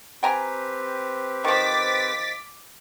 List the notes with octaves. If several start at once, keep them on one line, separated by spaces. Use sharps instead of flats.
C4 G4 B4 G5 G#5 A#5
D#3 F3 D6 A6 B6